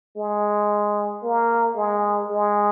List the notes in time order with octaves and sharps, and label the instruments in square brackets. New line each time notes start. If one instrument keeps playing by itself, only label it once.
[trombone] G#3
A#3
G#3
G#3